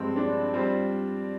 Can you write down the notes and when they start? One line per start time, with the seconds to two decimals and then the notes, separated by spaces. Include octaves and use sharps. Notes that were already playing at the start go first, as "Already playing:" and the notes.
Already playing: G2 F3 G#3 C4
0.16 D4
0.53 G3 C4 F4 C5